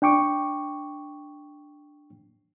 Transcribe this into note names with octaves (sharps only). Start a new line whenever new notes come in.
D4 G5 C#6 D6